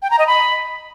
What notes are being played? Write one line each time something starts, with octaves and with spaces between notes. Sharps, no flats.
G5
A#5
D#5
B5